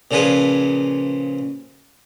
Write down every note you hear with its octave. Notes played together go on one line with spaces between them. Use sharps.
A#2 C#3 F3 G#4 B4